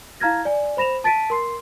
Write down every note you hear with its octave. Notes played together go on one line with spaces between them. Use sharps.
E4 F5 A#5 F6 G#6 A#6
D5 G#5
C5 B5 A#6 E7 F7
A5 A6 B6 D7 D#7
A#4 C6 C7